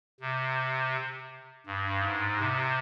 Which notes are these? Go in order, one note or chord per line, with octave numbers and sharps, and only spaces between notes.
C3
G2
G#2
C3